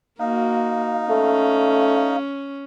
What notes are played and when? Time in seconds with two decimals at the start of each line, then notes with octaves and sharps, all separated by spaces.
0.20 A#3 D#4 F#4 F5
1.10 A3 C#4